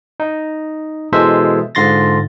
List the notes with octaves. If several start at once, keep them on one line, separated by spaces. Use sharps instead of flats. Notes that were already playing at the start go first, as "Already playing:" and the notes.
D#4
B2 E3 G#3 A4 C5 E5
G#2 D3 F4 C6 A6 A#6